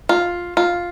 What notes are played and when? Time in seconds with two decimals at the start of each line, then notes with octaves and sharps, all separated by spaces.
0.09 F4
0.57 F4